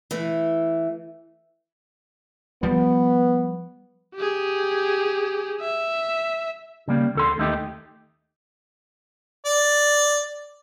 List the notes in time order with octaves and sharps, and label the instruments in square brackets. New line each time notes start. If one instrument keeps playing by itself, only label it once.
[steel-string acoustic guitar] E3 A3
[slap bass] F3 G3 [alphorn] B3
[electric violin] G4 G#4
E5
[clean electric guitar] C#3 G3 A#3
D2 A4 C6
D#2 A3 D#4 G4
[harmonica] D5